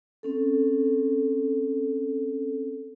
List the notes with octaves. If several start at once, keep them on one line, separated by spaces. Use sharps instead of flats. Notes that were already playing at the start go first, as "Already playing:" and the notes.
C4 C#4 A4